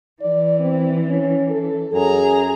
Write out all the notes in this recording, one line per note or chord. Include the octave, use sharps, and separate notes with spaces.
E3 D5
C4
C#4
A4
F#2 G#4 A#5